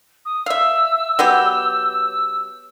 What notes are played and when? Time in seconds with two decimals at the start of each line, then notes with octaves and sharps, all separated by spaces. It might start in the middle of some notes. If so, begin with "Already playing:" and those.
0.25 D#6
0.46 E5 F5 E6
1.19 F#3 B3 G4